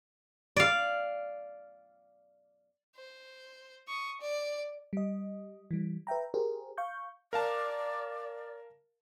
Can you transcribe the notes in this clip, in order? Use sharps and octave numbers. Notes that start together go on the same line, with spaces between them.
D5 F5
C5
C#6 D#6
D5
G3 D#5
E3 G3
B4 E5 G5 A#5
G4 G#4 A#4 C5
F5 C#6 G6
A#4 D5 F5 A5